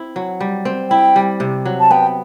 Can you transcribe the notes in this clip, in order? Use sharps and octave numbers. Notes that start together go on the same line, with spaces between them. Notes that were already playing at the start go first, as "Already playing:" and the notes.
Already playing: C4 E4
F#3
G3
C4
E4 G5
G3
C3
F#3
A5
B3 G5